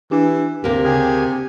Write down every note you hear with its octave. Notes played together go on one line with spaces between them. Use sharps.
E3 D4 G4
D2 C3 A#3
C#3 G4 G#4 G#5